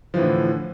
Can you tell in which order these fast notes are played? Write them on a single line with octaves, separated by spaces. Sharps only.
F3 E3 A2 D3